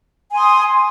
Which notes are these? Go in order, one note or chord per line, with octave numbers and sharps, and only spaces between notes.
G#5 C6 D#6